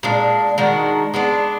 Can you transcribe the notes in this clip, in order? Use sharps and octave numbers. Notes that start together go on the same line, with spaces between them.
A#2 G#3 D4
D#3 G#3 D4 F#4
G#3 B3 D4